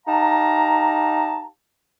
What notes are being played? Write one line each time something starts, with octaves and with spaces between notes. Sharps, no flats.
D#4 G4 F5 A5 A#5